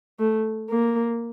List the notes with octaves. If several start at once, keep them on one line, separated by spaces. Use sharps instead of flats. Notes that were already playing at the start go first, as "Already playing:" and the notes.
A3
A#3